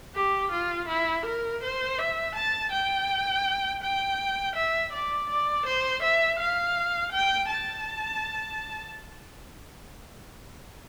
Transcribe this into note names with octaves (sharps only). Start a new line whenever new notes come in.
G4
F4
E4
A#4
C5
E5
A5
G5
G5
E5
D5
D5
C5
E5
F5
G5
A5